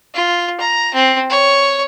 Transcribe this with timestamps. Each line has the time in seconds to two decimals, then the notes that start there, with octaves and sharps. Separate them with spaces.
0.14 F4
0.60 A#5
0.94 C4
1.30 C#5